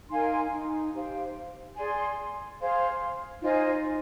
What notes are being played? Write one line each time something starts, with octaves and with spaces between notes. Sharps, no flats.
D#4 A#4 F5 G#5 C6
D#4
G4 C5 F5
G#4 D5 G#5 C6
G#4 C5 F5 C6
D#4 F4 C5 D#5 G#5